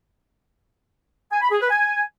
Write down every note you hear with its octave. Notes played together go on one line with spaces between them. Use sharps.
G#5
B5
G#4
B4
G#5